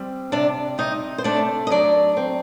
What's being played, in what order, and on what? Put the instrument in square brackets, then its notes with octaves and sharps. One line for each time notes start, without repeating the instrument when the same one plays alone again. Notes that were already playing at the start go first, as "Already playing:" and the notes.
Already playing: [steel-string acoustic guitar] G3 C4
C3 D4 D5
C3 D#4 D#5
C5
A3 D4 D5
D#5
F#3 D4 D5
C4